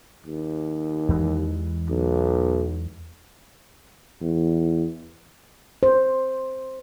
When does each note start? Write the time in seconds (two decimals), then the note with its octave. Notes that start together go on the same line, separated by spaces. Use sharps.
0.27 D#2
1.09 E2 E3 G#3
1.90 B1
4.21 E2
5.83 C5